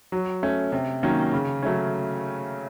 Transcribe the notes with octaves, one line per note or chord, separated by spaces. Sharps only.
F#3
A3 C#4
C3
D#3 F#3 A#3 C#4
C#3
F#3 A3 C#4